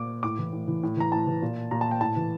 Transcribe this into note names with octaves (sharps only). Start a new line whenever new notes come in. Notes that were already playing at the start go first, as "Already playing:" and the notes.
Already playing: A#2 D6
A2 D6
E3
A2
E3
A2
E3 A#5
A2 A5
E3
A#2
A#2 A#5
A5
G5
A2 A5
E3